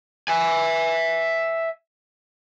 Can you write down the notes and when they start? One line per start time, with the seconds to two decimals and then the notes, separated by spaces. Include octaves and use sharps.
0.28 E5 G#5